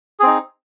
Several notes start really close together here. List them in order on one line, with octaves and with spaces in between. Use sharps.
G#4 C4 D#4